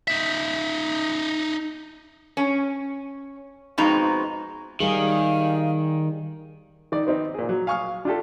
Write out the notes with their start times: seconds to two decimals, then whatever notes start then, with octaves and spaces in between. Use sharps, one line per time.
0.08 D#4 E5
2.37 C#4
3.78 F2 B2 G#3 C4 D#4 A#5
4.80 D#3 G3 G#4 F5
6.92 D#3 D5
7.07 B3 C4 D#4
7.34 A#2 G#4
7.49 F#3
7.67 F5 G#5 C#6 D#6 F6
8.05 D4 F4 G4 A4